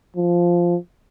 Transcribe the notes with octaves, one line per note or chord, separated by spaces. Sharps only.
F3